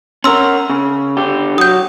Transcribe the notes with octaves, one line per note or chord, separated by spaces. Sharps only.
C#4 A#4 C6 E6
C#3
D3 G4
F#3 D#6 G6